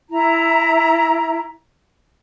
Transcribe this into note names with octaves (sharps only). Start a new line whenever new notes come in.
E4 A#5